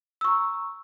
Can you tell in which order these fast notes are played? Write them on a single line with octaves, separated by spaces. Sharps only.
E6 C#6 A#5